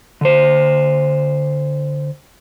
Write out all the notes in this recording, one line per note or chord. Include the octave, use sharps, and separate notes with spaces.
D3 C5